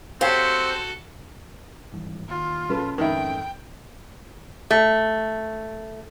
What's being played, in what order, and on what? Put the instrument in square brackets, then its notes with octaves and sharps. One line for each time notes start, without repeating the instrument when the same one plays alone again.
[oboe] C4 [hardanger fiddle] F#4 A4 [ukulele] G4 C#5 F5 [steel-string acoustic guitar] C5
[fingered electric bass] G#1 G2 E3
[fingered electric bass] D#2 [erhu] F4
[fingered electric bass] A#1 [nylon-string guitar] C#4 A4 B4
[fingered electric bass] F2 G#2 [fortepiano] D#3 E4 [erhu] G5
[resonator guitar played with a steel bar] A3